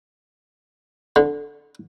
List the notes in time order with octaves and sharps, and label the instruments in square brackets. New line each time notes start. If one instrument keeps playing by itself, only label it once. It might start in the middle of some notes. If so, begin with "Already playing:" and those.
[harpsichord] D3